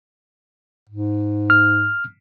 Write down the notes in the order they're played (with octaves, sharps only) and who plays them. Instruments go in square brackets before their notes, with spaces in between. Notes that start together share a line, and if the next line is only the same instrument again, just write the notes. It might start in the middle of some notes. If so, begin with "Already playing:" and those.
[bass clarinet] G#2
[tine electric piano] F6